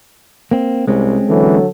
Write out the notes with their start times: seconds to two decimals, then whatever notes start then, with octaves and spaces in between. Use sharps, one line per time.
0.51 A#3 C4
0.88 C2 G#3 C4 C#4
1.29 D3 E3 F#3 A4